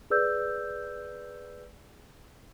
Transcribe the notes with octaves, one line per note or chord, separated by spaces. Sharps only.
G#4 B4 D5 E6 G6